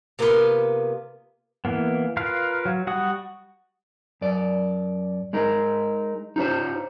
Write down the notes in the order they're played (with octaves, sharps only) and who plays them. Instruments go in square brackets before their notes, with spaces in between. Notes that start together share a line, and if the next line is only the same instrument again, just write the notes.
[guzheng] C3 A#3 B3 F4 B4 C6
[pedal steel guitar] E3 A#3 B3
F4 A#4 B4 F5
F#3
G3 F#4 F#5 D#6
[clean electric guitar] F#2 D5
G#3 D#4 A#4
D#4 F4 G4 C5 C#5